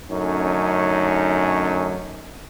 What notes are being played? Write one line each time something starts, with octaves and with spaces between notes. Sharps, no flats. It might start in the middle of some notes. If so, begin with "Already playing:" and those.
F#2 D3 A3 C#4 D#4